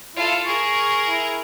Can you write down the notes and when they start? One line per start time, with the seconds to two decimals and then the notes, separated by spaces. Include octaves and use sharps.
0.16 E4 F4 A4
0.47 G#4 A#4 C#6
1.09 E4